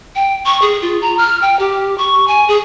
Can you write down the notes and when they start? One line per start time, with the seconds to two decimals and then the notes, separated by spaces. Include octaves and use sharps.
0.16 G5
0.46 C#6
0.62 G#4
0.82 F4
1.02 A#5
1.18 F6
1.42 G5
1.59 G4
1.98 C#6
2.28 G#5
2.48 G#4